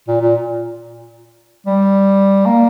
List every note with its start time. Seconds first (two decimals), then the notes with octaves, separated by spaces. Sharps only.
0.08 A#2
0.21 A#2
1.67 G3
2.46 A#3